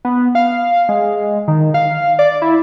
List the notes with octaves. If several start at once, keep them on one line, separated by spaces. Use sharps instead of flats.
B3
F5
G#3
D#3
F5
D5
E4